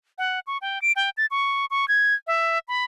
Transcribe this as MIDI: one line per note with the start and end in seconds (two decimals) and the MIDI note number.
0.18 0.40 78
0.47 0.58 85
0.62 0.81 79
0.82 0.92 98
0.96 1.10 79
1.17 1.26 93
1.31 1.66 85
1.71 1.88 85
1.88 2.14 92
2.27 2.59 76
2.68 2.85 83